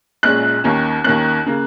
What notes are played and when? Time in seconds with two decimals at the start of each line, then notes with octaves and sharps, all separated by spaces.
0.23 A#1 A#2 G#3 C#4 F#6
0.64 D#2 D#3 A#3 C#4
1.04 D#2 D#3 A#3 C#4 F#6
1.46 C#3 A#3